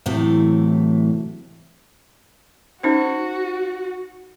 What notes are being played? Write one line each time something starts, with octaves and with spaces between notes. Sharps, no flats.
A2 C3 E3 F#3 A3
C#4 D#4 F#4 C5